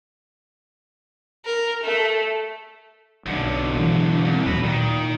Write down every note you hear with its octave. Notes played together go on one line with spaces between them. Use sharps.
A#4
A3
B1 F#2 D3
B2 E3
C2
D#2 A#2 F#3 F#4 B4
A#2 D#3